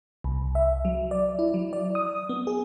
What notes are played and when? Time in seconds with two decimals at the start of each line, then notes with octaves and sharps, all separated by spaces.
0.24 C2
0.55 E5
0.85 F#3
1.11 D5
1.39 E4
1.54 F#3
1.73 D5
1.95 D#6
2.29 B3
2.47 G#4